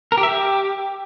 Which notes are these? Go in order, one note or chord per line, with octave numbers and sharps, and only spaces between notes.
A#4
G4
E5
G4